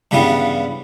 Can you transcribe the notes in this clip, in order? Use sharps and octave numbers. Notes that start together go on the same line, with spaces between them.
G2 C#3 E3 G3 B3